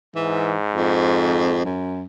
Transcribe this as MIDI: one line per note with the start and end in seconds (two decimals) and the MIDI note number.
0.16 1.80 44
0.16 0.55 52
0.75 1.62 41
1.65 2.05 42